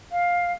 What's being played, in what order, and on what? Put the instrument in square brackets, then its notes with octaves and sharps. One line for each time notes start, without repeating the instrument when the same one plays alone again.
[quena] F5